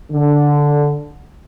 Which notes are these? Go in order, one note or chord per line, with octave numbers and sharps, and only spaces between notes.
D3